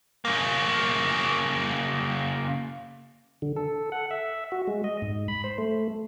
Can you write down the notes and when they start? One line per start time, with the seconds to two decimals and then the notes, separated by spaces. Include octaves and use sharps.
0.25 C#3 A#3
3.42 D3
3.56 A4
3.92 F#5
4.11 E5
4.52 F#4
4.67 G#3
4.84 D#5
5.02 G#2
5.28 B5
5.44 C5
5.58 A3